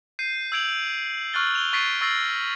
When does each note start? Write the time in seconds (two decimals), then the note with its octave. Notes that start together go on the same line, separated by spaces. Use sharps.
0.19 G6 C7 D#7
0.52 E6 G6 G#6 D7 F7 F#7
1.33 C#6 F6 F#6 A6 G7
1.55 F7 G7
1.73 C#6 A6 B6 C7 D7 D#7
2.01 C#6 E6 A6 A#6 C7